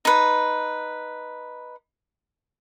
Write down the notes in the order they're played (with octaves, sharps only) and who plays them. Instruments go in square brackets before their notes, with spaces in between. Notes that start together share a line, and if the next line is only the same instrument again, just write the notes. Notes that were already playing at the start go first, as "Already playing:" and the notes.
[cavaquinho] D#4 B4